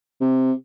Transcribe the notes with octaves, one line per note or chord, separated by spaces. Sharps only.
C3